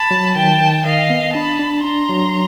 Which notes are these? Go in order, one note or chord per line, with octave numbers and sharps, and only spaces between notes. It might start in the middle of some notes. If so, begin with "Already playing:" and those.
Already playing: A5 B5
F#3
D#3 G5 A5
D#3
D#3 D#5 F5
B3
D4 A5 B5
D4
D4 A#5 C6
F#3